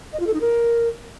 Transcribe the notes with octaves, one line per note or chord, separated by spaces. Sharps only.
D#5
F4
A4
D#4
A#4